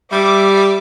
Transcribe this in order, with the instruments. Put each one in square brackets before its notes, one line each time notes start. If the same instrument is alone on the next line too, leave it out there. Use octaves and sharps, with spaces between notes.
[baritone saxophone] G3 [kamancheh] E5 [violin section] D6